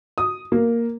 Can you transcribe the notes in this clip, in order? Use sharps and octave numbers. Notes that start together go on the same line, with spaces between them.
D#6
A#3